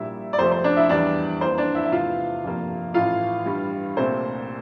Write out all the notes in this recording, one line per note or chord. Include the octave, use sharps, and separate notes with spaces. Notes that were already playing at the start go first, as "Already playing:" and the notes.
Already playing: A#1 A#2 G3 E4 E5
D5
F2 C3 F3 A3 C5
C5
D4 D5
E4 E5
E2 E3 G3 D4 D5
F2 E3 A#3 C5
D4 D5
E4 E5
E5
F1 E2 E3 F4 F5
G1 F2 C3 F3 A#3
A1 A2 E3 A3 F4 F5
G2 E3 G3
C2 A#2 A3 C4 C5